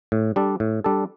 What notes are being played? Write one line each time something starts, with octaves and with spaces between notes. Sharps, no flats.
A2
G3 D4 A4
A2
G3 D4 A4